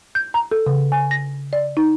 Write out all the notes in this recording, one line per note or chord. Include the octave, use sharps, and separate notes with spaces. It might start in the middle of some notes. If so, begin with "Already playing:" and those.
G6
A#5
A4
C#3
G#5
A#6
D5
D#4